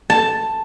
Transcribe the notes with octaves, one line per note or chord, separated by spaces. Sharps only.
A5